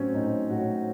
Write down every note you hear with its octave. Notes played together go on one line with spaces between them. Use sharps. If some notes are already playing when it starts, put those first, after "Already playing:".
Already playing: A2 F#3 C4 C#4
A2 D#4
A2 F#4